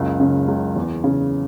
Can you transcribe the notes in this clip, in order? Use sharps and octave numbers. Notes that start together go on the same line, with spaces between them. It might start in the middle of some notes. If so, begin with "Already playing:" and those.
Already playing: F#1 C#2
C#3
C#2
E2
C#3